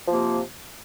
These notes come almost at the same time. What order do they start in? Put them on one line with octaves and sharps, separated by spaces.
F3 A#3 C3